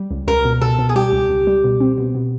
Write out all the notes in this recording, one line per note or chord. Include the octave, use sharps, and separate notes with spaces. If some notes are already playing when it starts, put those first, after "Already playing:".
Already playing: G3
C#2
C#2 A#4
B2
B2 A4
B2
G#4
G3 G4
C#2
C#2
G3
B2
C4
B2
B2